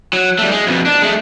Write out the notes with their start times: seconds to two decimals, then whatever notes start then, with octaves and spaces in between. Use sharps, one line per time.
0.13 F#3
0.38 G3 A3
0.51 G#3
0.67 F2 B2
0.86 D4
1.02 G#3 A3